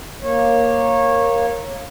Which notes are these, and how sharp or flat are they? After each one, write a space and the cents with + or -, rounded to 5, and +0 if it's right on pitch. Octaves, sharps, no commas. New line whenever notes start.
A#3 +0 C#5 -20